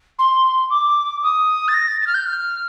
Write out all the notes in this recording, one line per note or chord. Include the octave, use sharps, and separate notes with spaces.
C6
D6
D#6
A6
A#6
A6
A6
F6
G6
F6